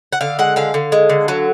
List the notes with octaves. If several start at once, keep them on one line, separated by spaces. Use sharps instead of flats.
F#5
D3 F5
G#3 F#5
D3 F5
D3
G#3
D3
F#3